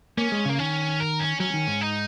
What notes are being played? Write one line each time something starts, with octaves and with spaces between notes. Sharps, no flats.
A#3 C#4
G#3
C#3 A#3
D#3 C#4
A#4
C#4
F#3 C#4
D#3
G#2
D#4